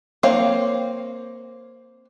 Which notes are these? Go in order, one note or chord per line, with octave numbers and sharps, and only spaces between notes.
A#3 C4 C#5 F5